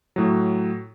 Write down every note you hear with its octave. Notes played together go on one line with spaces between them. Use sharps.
A2 F#3